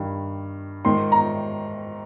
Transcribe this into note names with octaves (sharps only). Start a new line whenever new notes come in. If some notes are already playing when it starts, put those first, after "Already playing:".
Already playing: G2 D#3
G#2 D#3 C6
A#5